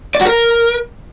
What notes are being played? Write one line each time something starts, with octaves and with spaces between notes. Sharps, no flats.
D5
F#4
A#4